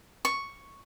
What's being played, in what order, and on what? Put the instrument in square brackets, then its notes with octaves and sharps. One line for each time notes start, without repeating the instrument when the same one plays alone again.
[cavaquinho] C#6